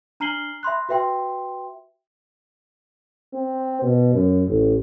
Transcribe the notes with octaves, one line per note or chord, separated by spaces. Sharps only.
D4 A#5 F6 C7 F#7 G7
E5 B5 C6 F#6
F#4 B4 E5 G5 C6
C4
B2
F#2
A1